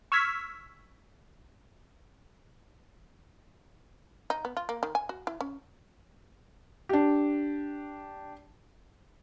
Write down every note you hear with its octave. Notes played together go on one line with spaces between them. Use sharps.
C#6 E6 F6 G#6 B6
D#4
B3
F4
A#3
D#3
G#5
F#4
E4
C#4
D4 G4